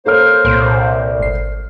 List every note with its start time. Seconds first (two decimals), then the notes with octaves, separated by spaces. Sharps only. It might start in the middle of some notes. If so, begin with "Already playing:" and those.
0.06 A#3 A4 A#4 C5 C#5 F6
0.45 C2 A#2 C6 D7
1.19 G#1 C7